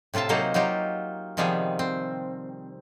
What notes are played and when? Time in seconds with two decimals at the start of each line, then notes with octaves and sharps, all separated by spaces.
0.14 A2 C3 F4 E5 A5
0.29 C3 F#3 A#3 D#4 C5 F#5
0.54 F#3 D#4 F4 G4
1.37 C3 D#3 F3 G3 B3 G#4
1.79 C4